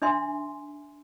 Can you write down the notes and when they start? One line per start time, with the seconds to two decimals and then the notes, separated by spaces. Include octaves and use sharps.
0.02 D4 D#4 E5 G#5 C6